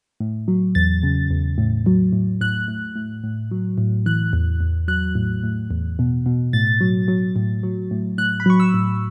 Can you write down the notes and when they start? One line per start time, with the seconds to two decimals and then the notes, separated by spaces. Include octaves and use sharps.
0.20 A2
0.48 F#3
0.75 E2 A6
1.03 C#3
1.30 E2
1.58 A2
1.86 F#3
2.13 A2
2.41 A2 F#6
2.68 A2
2.96 A2
3.24 A2
3.51 F#3
3.78 A2
4.06 E3 F#6
4.33 E2
4.60 E2
4.88 F#3 F#6
5.15 A2
5.43 A2
5.71 E2
5.99 B2
6.26 B2
6.53 A2 A6
6.81 F#3
7.08 F#3
7.36 A2
7.63 F#3
7.91 A2
8.18 A2 F#6
8.40 B5
8.46 F#3 C#6
8.60 E6
8.74 A2